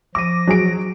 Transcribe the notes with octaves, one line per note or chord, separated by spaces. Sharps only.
F3 D6 A#6 D#7
F#3 G#4 D7